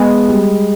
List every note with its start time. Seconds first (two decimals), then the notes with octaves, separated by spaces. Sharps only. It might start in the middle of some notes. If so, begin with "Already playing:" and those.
Already playing: G#3 B3
0.29 G3